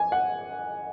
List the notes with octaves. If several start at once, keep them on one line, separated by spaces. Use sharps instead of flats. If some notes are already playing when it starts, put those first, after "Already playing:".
Already playing: G#5
F#5